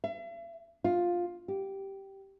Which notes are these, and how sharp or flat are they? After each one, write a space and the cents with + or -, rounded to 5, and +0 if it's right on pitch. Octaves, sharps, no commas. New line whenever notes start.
E5 +45
F4 +10
G4 -10